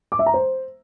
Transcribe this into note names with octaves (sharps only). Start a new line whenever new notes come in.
D6
E5
A#5
C5